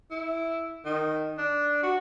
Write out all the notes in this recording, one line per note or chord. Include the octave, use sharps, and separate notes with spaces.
E4
D#3
D4
F#4